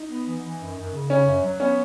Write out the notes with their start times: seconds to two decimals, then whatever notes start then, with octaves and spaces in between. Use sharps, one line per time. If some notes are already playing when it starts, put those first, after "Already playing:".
Already playing: D#4
0.10 B3
0.27 E3
0.44 E3
0.60 F#2
0.77 F#2
0.94 C#3
1.10 C#3 C#4
1.27 F#2
1.44 F#3
1.60 B3 C#4